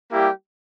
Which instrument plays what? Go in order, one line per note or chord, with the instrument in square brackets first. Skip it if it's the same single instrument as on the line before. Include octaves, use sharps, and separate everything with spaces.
[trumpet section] G3 A#3 E4 G4